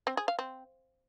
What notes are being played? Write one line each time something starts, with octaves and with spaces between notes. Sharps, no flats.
C4
G#4
F5
C4